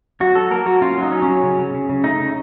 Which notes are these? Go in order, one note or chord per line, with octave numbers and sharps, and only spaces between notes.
F#3 F#4
F#3 A4
A#3 A#4
F#3 F#4
C#4 F4
F#3
D#4
C#4
C#4
F#3
C#3
C#3
C#3
C#3
A3 D#4
C#3